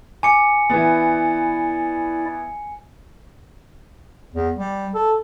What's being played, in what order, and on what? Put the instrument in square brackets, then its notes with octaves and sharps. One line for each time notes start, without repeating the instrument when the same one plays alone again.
[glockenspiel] G#5 C#7 [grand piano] D6
[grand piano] E3 B3 [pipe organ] E4 D5
[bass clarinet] E2
G3
A4